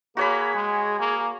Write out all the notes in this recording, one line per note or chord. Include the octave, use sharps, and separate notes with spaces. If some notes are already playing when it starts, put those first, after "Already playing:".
A#3 F#4 G#4 C#5 B5
G#3
A#3